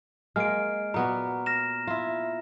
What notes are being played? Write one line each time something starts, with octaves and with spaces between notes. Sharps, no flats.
G#3 A#3 F6 D7
A#2 B3 F#4 A#5
F6 A#6 E7
E4 F4